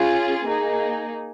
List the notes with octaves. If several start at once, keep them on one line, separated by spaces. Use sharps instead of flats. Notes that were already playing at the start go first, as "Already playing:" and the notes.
Already playing: C#4 F4 G#4
A#3 D#4 G#4